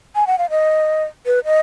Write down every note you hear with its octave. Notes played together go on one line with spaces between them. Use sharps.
G#5
F#5
F5
D#5
B4
D#5